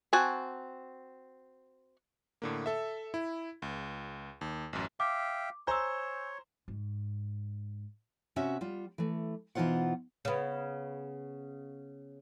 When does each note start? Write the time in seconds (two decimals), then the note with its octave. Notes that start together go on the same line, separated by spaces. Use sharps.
0.13 C4 F#4 G#5 A5
2.42 A2 D3 A#3
2.66 A4 E5
3.14 E4
3.62 C#2
4.41 D#2
4.73 A1 F#2
5.00 E5 F5 G5 D6
5.67 C5 C#5 G#5 A#5 E6 G6
6.68 G#2
8.36 C3 C#4 F#4 E5
8.61 G3 F4
8.98 E3 A3
9.55 B2 E3 D#4 F4 C5 F#5
10.25 C#3 B3